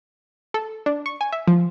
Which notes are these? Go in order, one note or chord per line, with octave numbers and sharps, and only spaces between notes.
A4
D4
C#6
G#5
E5
F3